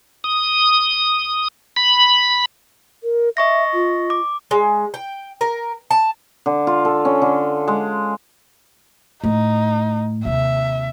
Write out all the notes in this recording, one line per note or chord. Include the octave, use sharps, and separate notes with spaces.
D#6
B5
A#4
D#5 E5 C#6 A#6
F4
D6
G#3
G5
A#4
A5
D3
F4
A4
C#4
D3
G#3
A2 D#4
D#2 C3 E5